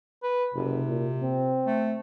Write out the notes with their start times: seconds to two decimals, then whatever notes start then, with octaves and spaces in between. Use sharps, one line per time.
0.23 B4
0.54 F#1 C3
0.88 A#2
1.23 C4
1.66 A3